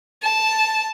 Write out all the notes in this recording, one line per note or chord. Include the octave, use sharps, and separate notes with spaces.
A5